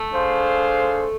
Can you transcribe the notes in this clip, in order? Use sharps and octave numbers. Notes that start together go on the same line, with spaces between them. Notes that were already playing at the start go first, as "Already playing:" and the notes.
Already playing: A3
D4 G#4 C5 F5